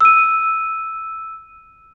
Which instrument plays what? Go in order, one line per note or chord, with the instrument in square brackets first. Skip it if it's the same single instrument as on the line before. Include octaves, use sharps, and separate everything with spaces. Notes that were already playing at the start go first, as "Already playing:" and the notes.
[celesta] E6 D#7